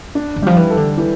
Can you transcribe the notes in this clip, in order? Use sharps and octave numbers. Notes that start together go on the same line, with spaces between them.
D4
D3
F3 G3
E3
A4
D3
E3